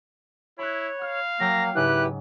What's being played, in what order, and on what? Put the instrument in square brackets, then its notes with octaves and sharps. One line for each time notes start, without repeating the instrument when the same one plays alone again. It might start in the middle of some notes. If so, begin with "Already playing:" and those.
[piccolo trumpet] E4 [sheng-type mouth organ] C#5 [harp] B5 F#6
[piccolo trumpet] F5 [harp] F6
[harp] F#3 G5 E6 [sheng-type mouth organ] A#3 [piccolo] A#6
[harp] G#2 C#3 [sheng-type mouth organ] E4 G4 B4 [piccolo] F#6